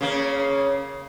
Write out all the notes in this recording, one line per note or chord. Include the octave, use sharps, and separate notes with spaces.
C#3 A#3